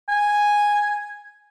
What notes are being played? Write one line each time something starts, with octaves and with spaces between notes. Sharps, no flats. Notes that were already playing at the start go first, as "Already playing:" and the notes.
G#5